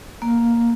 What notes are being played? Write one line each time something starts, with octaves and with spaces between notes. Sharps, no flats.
A#3